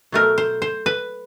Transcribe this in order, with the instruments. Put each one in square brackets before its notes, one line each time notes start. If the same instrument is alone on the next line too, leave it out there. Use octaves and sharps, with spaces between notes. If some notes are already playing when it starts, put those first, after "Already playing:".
[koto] B2 F#3 A3 A#4
C5
C5
B4